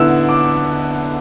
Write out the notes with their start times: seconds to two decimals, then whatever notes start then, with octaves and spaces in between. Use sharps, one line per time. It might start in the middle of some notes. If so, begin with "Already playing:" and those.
Already playing: D3 B3 E4 E6
0.29 D6